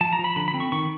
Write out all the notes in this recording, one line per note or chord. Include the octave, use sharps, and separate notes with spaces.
F3 A5
A#5
F3
B5
D3 B5
B5
C4
C#6
D#3 C#6